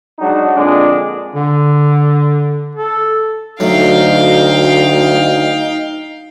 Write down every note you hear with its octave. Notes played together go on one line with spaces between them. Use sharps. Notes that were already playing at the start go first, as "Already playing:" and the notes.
F#3 G#3 D4 D#4 F#4
F2 A#2 D3 G#3 D4
D3
A4
D2 F#3 A3 D#4 F5 G5